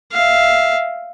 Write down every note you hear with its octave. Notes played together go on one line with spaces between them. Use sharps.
E5 F5